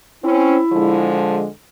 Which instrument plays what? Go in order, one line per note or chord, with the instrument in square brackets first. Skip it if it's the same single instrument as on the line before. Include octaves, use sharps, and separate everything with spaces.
[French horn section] C4 C#4 [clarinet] E4
[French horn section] D3 F3 G#3